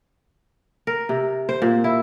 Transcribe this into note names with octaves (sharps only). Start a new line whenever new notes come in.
A#4
C3
C5
A#2
E4